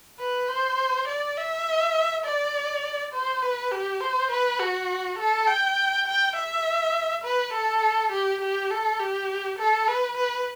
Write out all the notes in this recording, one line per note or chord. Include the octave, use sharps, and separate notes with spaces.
B4
C5
D5
E5
D5
C5
B4
G4
C5
B4
F#4
A4
G5
G5
E5
B4
A4
G4
G4
A4
G4
A4
B4
B4